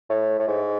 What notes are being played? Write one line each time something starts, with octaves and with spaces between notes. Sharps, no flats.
A2
A2
G#2